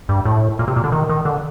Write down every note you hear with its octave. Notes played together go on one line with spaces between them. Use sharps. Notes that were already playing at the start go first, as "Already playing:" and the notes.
G2
A2
A#2
C3
A#2
D3
D#3
D#3
D3